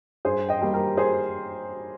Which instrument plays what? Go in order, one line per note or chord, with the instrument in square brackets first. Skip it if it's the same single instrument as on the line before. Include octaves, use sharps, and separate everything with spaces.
[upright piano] G2 G#4 C5
D#5 G5
G3 A#3
G4 A#4
G#4 C5